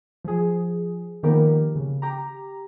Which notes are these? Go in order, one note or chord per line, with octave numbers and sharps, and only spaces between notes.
F3 G#4
D#3 F3 A#3 B3 G4 A#4
C#3
G4 A#5